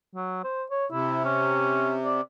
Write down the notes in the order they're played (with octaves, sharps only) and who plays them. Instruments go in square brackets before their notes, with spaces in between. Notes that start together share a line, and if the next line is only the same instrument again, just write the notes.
[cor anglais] F#3
C5
C#5
[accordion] C3 [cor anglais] E4
[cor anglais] C#4
D5